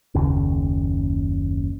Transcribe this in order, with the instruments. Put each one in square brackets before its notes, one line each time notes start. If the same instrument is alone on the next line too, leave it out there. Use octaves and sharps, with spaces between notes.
[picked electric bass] F#1 D#2 C#3